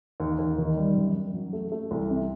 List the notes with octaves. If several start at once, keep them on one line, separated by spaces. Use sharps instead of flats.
D#2
D#2
D#3
G3
F#2
F#2
F#3
A3
A3
C2
C3